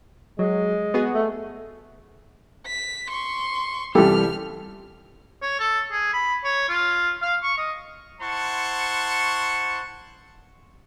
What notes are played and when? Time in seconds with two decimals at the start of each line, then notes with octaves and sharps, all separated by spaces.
0.39 F#3 G#3
0.94 B3 F#4 G#4
1.14 A3
2.67 B6
3.08 C6 C#6
3.95 C2 E3 G3 G4 A4 F6
5.42 C#5
5.60 A4
5.92 G#4
6.14 B5
6.44 C#5
6.69 F4
7.22 F5
7.43 C#6
7.58 D#5
8.22 E4 C5 F#5 A5 C6 C#6